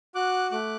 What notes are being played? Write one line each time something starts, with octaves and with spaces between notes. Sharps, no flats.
F#4 D6 F#6
A3 D6 F#6